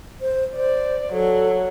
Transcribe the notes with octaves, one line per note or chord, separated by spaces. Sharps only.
C5
C5 D5
F#3 A4